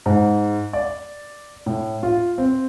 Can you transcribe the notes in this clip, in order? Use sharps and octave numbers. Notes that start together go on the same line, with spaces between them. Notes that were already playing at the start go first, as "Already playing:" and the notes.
G#2
D5
A2
F4
C4